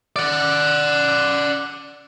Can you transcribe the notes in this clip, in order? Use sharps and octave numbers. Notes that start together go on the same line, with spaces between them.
D5 F#5